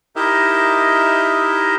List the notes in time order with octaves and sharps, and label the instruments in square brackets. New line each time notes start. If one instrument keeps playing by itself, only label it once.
[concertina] D#4 E4 G4 A#4 D#5 E5